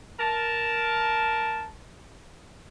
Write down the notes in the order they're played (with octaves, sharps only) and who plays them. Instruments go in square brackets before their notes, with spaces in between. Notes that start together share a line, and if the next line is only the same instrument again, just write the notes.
[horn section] A#4 A5